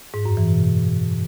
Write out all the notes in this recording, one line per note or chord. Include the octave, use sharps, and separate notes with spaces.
G#2
F#2
E3
B2